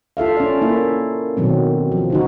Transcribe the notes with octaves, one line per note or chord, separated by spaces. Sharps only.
F4 A4 E5 F5
C#4 D5
A#3 E4 E5
B2 D#3 F#3 C4
F3
D3 D#4 F#4